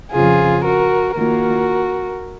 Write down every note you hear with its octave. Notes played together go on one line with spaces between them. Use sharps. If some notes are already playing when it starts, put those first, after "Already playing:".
F2 C#3 F3 F4 G#4
F#4 A#4
D#3 A#3 F4 F#4 A#4